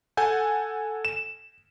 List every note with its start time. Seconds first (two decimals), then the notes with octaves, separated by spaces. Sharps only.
0.17 A4 F#5 G#5 G6
1.05 E7